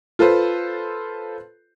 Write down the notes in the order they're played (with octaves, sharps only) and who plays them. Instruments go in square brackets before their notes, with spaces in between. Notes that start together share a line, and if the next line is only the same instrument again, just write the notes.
[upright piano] F4 A4 B4 C5